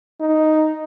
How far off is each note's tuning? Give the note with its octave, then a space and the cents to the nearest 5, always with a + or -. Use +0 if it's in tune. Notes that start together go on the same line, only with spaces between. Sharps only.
D#4 +0